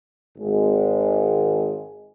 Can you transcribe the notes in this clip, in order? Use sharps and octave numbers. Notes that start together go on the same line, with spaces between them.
G#1 G#3